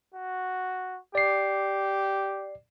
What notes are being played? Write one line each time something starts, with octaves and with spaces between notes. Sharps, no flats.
F#4
G4 D5 C7